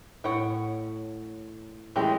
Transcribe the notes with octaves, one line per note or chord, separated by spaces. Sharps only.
A2 C#5 F#5 G5
E3 G#3 A3 C#4 G4 G#4